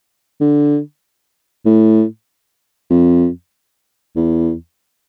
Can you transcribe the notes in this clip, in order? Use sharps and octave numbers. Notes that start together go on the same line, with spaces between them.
D3
A2
F2
E2